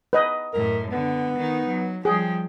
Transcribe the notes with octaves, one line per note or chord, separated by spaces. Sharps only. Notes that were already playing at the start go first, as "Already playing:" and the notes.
B4 D#5
F#2 A2 A#4
D3 B3
D#3 D#4
F#3
F3 G3 G#4 G5